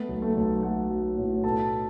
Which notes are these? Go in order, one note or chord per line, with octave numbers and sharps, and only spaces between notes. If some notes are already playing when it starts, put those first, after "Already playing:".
Already playing: A3 B3 B4
B1
A3 A4
B1
A3 F#4 F#5
F#3
A2
B2 A4 A5